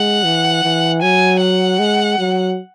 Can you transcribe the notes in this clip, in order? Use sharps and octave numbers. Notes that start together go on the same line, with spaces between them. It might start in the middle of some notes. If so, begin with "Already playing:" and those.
Already playing: G#3 F#5
E3
E3
F#3 G#5
F#5
G#3
F#3